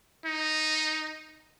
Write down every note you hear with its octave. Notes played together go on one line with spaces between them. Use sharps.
D#4